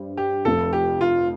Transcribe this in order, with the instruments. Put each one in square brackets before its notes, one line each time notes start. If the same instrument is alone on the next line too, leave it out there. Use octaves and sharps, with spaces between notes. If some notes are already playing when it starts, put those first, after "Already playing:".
Already playing: [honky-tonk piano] G2 G3 C5
[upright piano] G4
[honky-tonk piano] F1 F2 F3 A3 [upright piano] A4
[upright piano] G4
F4